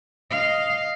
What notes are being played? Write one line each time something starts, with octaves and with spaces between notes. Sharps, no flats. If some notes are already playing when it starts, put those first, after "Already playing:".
D#5 F5